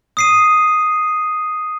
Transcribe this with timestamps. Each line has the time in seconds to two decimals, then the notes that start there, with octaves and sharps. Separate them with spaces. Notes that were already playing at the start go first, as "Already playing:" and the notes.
0.17 D#6 C7 D#7